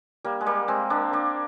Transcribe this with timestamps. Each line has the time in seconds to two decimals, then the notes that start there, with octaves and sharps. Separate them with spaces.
0.25 G3 A#3
0.41 G#3
0.46 G3 A#3
0.68 G#3 C4
0.90 A#3 D4
1.13 A#3 D4